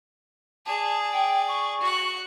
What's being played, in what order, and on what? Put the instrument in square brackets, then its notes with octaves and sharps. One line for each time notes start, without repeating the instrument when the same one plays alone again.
[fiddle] G#4 D5 [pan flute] A5
[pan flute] G5
C#6
[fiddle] F#4 F#5